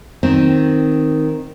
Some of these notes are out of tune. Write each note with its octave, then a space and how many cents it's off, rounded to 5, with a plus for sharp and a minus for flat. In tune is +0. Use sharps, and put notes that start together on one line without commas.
D#3 +0 C4 +0